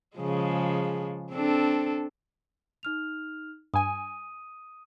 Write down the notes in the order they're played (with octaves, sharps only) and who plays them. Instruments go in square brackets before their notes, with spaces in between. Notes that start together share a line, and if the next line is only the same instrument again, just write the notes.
[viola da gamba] C#3 F3 G#3
C4 D4 A4
[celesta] D#4 F6 F7
[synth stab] G2 G#5 [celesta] D#6 D#7